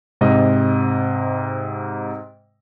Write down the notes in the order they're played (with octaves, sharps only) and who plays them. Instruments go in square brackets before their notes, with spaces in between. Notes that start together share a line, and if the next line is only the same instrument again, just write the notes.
[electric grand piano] G#2 C3 D#5